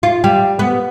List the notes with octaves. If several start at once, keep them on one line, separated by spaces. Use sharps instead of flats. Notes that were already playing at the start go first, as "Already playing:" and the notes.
F4
G3
B3